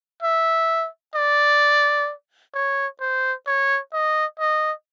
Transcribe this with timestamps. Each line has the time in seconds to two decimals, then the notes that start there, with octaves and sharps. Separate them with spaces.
0.22 E5
1.15 D5
2.54 C#5
3.00 C5
3.47 C#5
3.93 D#5
4.39 D#5